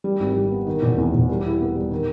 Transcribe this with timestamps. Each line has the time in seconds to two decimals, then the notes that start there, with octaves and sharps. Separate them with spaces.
0.04 G3
0.20 G#1
0.36 G3
0.51 B3
0.67 D#3
0.82 E1
0.98 E2
1.14 E1
1.29 G3
1.45 E4
1.60 B3
1.76 G3
1.91 D#3